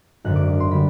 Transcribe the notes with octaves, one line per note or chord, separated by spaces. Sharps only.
G#1 F#2 D3 F#6
D6
D6
C6
D3 G3 B5